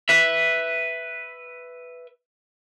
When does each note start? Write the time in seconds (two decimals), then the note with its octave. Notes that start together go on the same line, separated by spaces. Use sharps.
0.09 B4 E5